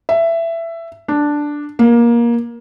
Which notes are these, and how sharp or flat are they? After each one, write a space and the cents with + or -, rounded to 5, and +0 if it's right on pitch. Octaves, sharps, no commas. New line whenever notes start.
E5 +15
D4 +0
A#3 +20